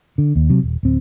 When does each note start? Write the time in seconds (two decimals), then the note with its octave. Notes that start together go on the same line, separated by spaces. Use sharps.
0.18 D3
0.36 D#2
0.50 C3 F#3
0.63 D#1
0.83 D1 C4